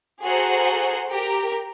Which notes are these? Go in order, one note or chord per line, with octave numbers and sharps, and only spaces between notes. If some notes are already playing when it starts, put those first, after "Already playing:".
F#4 G#4 A4 C5 F#5 A#5
G4 A#4 A#5